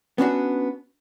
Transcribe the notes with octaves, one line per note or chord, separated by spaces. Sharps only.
B3 C#4 D4 F#4